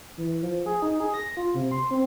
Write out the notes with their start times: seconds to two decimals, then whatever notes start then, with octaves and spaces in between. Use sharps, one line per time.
0.17 E3
0.42 F3
0.66 G#4
0.82 D#4
1.00 G#4
1.14 A#6
1.37 F4
1.54 C3
1.71 C6
1.91 C4